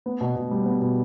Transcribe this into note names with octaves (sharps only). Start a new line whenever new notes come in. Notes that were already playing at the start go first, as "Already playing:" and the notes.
B3
B2
B2
G3
B3
B2